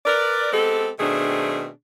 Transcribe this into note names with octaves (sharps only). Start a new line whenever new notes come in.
A#4 B4 D5
G#3 B3 C4 G4 A4
B2 D#3 A3 C4 D4 G#4